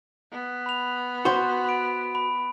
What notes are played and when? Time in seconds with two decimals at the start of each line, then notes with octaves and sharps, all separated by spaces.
0.32 B3
0.66 B5 F7
1.25 F#4 C5
1.64 B5 D7
2.15 B5